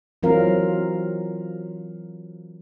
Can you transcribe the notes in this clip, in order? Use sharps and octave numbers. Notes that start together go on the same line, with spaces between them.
E3 F#3 C4 F4 A#4 F5